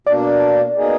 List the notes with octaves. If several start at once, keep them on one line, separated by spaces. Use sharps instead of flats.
B2 A#3 D4 D5
B2 A#3 D#4 G#4